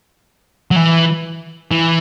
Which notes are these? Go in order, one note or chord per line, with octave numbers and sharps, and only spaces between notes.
F#3
E3
E3